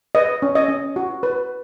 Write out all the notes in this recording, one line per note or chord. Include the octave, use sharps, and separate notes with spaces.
B4 D#5
C#4
D#5
C#4
F#4
B4